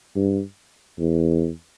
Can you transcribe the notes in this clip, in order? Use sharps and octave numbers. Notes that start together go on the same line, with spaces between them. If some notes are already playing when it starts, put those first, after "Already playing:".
G2
E2